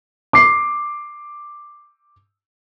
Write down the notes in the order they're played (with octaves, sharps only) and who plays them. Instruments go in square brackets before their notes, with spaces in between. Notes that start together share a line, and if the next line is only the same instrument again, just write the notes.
[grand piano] D6 C7